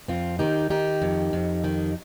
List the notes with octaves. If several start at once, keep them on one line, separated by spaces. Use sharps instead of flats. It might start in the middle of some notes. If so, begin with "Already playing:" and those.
F2 C4 F4
D#3 D#4 G4
D#3 D#4 G4
F2
F2
D#3